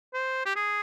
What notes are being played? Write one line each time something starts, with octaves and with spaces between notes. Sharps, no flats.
C5
G4
G#4